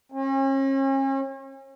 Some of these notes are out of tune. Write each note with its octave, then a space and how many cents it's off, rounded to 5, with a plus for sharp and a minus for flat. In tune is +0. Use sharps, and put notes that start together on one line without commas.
C#4 -40